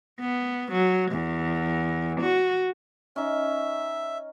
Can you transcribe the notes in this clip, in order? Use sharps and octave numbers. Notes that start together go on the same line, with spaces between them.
B3
F#3
E2
F#4
C#4 D#4 E5